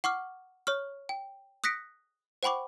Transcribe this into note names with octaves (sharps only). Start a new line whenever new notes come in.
F#5 C#6 D6 F6
C#5 C#6 F6
G5
D#6 F#6 A#6 B6 C#7 D7
C5 F#5 G5 B5 C#6 D6